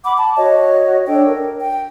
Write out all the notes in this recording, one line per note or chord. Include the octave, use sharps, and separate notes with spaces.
F#5 B5 D6
A5
F#4 C#5 D#5
D4 A4 C#5 G5
A#4
G5